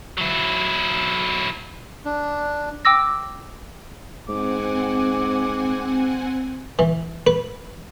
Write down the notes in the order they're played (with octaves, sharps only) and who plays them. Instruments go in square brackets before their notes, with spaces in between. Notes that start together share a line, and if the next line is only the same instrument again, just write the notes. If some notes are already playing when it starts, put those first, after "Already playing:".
[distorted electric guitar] F#3 E4
[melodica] D4
[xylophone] G5 D6 E6 A#6
[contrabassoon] G#2 [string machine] C4 F#5 G#5 [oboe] D6
[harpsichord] E3
B4